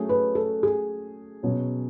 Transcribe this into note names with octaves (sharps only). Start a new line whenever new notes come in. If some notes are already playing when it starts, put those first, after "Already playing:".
Already playing: F#3 A3 C#4 G#4
B4
A4
G#4
B2 F#3 C#4